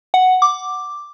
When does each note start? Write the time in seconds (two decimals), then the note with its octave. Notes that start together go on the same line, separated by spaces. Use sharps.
0.14 F#5
0.42 D6